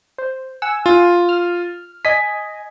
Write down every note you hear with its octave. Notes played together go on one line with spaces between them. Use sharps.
C5
F#5 G#5 E6
F4
F6
D#5 G#5 B6